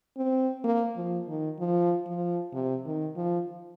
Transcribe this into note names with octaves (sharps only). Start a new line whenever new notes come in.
C4
A#3
F3
D#3
F3
F3
C3
D#3
F3